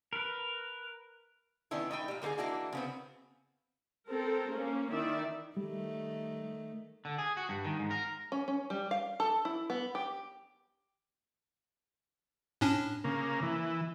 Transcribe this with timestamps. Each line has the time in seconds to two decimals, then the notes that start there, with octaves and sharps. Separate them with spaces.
0.13 A#4 B4
1.71 D#3 B3 C#4 D4 E4
1.91 A3 D#4 E4 G5
2.08 A#2 G3
2.22 D3 A#3 B3 D#4 G#4
2.38 E3 A#3 D4 E4 F#4
2.73 C#3 B3 C4
4.09 C4 A4 A#4 C5
4.51 A#3 C#4
4.91 D#3 E4 D5 E5
5.57 D#3 G3 A3
7.05 D3
7.18 G#4
7.37 F#4
7.49 G2
7.64 D#3
7.79 G#2
7.91 A#4
8.32 C#4
8.48 C#4
8.70 G3
8.91 F5
9.20 A4
9.45 E4
9.70 B3
9.95 G4
12.61 A2 C#4 D4
13.04 C#3 A#3
13.42 E3